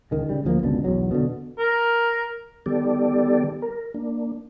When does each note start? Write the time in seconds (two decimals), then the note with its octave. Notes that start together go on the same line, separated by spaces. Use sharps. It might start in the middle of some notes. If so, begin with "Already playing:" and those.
0.11 C#2 D#3 G#3
0.29 C#3 G3
0.45 D2 F3 G3 A#3
0.63 G1 C#2 B2 D4
0.84 B1 E2 F#3
1.11 B2 D3
1.59 A#4
2.66 D#3 G3 B3 G4 A4 D5
3.62 A#4
3.94 A#3 D4